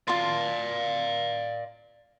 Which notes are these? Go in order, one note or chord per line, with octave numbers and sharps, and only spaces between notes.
F4 D5 F5 A5 C6